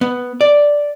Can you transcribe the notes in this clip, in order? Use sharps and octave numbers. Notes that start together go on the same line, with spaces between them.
B3
D5